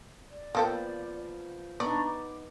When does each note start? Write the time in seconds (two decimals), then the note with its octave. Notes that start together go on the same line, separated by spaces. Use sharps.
0.28 D5
0.55 F3 A#3 B3 A4 G5
1.80 B3 D4 D#4 D5 A#5 C#6
2.02 D6